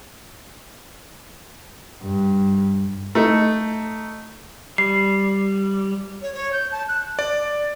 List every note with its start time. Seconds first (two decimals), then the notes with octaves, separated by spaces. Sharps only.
2.03 G2
3.15 A3 D#4
4.78 G3 C7
6.22 C#5
6.34 C#5
6.52 G6
6.71 A5
6.88 F#6
7.19 D5